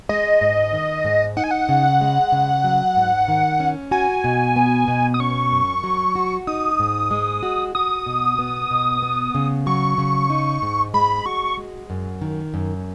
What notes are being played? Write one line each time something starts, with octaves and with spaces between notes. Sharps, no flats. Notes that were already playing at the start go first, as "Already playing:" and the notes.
G#3 D#5
G#2
D#3
G#2
D#4 F#5
G#5
F#5
C#3
G#3
C#3
F#3
G#2
D#3
C#4
F#4 G#5
B2
B3
B2
D#6
C#4 C#6
F#2
F#3
F#4
D#4 D#6
G#2
G#3
F#4
F#4 D#6
B2
B3
B2
B3
C#3
F#3 C#6
C#3
D#4
G#2
G#3 B5
F#4 C#6
G#3
F#2
D#3
F#2